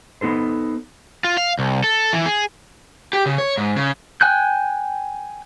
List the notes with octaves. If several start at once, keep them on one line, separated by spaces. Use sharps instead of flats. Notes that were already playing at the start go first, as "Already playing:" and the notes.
B3 D#4 A4 C5
F4
F5
C2
A4
E3
G#4
G4
C#3
C#5
G#2
C#3
G5 G#5 F#6 G6